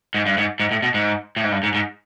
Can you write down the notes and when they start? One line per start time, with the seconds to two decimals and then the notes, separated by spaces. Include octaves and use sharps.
0.14 G#2
0.26 G2
0.38 G#2
0.60 G#2
0.71 A2
0.83 B2
0.94 G#2
1.36 A2
1.44 G#2
1.52 G2
1.63 G#2
1.74 G#2